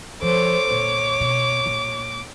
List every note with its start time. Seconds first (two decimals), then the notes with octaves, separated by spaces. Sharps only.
0.22 F3 A4 C5 C#5 D6
0.70 A#2 D3 C#5
1.21 B2
1.66 A#2